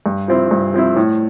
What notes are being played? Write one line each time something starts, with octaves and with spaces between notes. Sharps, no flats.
G2
F3 C4 E4
G2
F3 C4 E4
A2